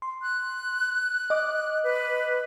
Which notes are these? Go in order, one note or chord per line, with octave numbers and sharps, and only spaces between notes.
C6
F#6
D#5 D6
B4